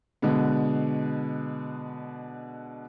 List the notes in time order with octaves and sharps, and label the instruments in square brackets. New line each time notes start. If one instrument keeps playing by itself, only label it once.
[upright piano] B2 D3 G#3 B3